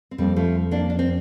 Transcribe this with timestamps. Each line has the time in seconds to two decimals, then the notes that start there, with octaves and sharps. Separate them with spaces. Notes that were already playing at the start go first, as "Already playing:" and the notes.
0.11 C4
0.18 F2 G3 A#3
0.36 F3 A3
0.71 A#3 D4
0.90 D4
0.99 C4